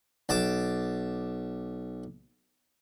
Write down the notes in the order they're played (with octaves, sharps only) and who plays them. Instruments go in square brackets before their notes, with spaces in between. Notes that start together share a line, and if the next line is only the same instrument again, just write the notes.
[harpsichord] B1 A5 D6